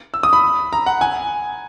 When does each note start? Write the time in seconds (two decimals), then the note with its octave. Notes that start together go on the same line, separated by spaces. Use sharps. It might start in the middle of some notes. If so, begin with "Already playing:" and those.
0.14 E6
0.23 D#6
0.33 B5
0.73 A#5
0.86 F#5
1.01 G#5